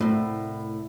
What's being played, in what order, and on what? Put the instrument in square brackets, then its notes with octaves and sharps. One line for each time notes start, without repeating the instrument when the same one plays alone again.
[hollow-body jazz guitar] C2 A2